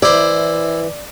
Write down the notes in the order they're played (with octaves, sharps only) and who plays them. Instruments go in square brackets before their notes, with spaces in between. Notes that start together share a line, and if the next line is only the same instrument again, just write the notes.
[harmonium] E3 [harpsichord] E4 C5 [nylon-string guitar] D5